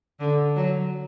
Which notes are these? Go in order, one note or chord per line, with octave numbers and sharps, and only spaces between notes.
D3
F#3